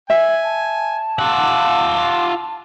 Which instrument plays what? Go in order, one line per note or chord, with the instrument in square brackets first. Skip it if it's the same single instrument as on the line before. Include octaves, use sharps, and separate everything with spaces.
[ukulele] E5 [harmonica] G#5
[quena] A5
[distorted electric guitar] F4 F#5 [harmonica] D6 E6